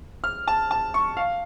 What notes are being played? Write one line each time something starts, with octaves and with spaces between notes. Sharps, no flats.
F6
A5
A5
C#6
F5